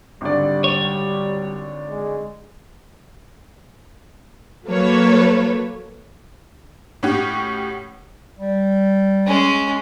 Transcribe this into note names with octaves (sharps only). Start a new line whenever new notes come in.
G#1 D3 G3 D5
C#5
G#3
F#3 A#3 A4 B4 C#5
A2 C#4 F#4 G4
G3
G#3 C#4